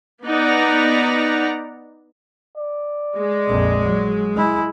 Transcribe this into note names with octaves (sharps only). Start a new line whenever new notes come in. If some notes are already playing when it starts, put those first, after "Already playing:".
B3 D#4 D5 F#5 A#5
D5
G#3
A#1 F2
F#3
G#3 E4 G#4